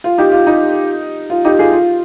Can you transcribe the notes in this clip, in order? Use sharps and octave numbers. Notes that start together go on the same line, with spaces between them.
F4
D#4 G4
F4
D#4
F4
D#4 G4
F4 G#4
F4